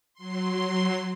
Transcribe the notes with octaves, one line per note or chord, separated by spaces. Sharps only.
F#3 C6